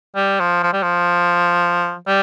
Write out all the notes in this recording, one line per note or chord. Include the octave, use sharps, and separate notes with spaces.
G3
F3
F3
G3
F3
G3